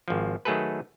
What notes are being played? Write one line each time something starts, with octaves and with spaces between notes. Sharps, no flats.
G#1 F3
D#3 F#3 A3 G#4 A4 B4